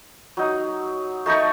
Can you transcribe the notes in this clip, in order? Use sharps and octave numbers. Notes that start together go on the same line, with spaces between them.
F#3 D#4
A3 D#4 A4 C#6